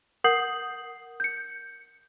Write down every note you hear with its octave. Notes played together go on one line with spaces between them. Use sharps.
A#4 F#5 D#6 G6 C7 F#7
G6 C#7